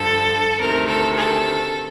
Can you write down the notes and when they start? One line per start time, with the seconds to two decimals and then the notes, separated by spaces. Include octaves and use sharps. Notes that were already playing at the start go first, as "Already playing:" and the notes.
Already playing: G2 D3 F3 A4
0.60 D2 C3 D#3 A#4
0.87 A4
1.16 A4